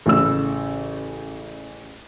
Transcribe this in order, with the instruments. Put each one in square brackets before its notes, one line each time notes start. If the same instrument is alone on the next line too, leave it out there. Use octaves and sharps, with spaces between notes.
[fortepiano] A1 C#3 E6